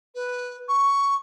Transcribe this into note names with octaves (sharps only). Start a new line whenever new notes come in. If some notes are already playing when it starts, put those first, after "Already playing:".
B4
C#6